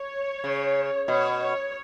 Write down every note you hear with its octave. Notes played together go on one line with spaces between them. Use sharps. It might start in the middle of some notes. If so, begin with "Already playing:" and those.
Already playing: C#5
C#3
B2 C#5
C#5